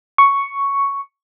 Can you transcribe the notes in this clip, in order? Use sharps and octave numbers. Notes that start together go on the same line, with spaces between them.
C#6